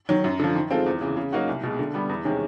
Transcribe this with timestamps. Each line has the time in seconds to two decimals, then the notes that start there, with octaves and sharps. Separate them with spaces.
0.09 D#3 F#3
0.24 F#2
0.40 D3 F3
0.55 D#3
0.71 G#3 C4 F4 A4
0.86 E2
1.01 C#3 E3
1.17 C#3
1.33 F#3 A#3 D#4 F#4
1.48 C2
1.63 B2 G#3
1.79 D3
1.94 G3 B3
2.09 E2
2.25 C3 D#3 G#3 C#4